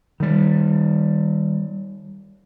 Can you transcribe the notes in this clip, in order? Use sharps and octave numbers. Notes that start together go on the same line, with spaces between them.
D#3 G3